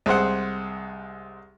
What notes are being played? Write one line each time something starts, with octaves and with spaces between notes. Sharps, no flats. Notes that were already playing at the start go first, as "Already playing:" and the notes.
C2 G#3 C5 F#5